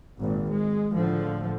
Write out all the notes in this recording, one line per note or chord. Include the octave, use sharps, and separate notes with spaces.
G#1 A#2
G#3
A2 D3 F3